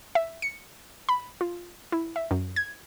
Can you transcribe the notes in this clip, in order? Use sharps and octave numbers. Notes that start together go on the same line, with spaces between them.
E5
C#7
B5
F4
E4
E5
F#2
G#6